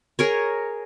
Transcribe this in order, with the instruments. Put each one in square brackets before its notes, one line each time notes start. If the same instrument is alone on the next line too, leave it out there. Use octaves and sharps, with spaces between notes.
[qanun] G#4 A#4 C#5